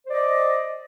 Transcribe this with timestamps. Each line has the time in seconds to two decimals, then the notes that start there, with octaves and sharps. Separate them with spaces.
0.05 C5
0.09 D5
0.13 D#5